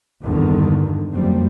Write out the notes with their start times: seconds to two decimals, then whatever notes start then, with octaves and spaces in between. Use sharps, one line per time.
0.23 G#1 E2 G2 D3 D#3
1.14 F#1 F2 G3 C4